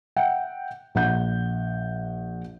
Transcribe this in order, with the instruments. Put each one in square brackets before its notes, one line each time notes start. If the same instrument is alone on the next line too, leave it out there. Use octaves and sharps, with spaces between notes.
[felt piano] E5 F#5 G5
A#1 F#5 G6